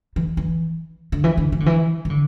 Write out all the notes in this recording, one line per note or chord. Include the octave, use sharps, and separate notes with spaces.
E3
E3
D3
E3
D3
E3
D3
E3
E3
D3